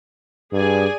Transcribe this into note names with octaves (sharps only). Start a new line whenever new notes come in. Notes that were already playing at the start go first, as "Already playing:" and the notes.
G2 G#4 D5 G#5